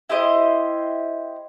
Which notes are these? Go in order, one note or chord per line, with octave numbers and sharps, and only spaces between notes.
E4 G4 C5 D#5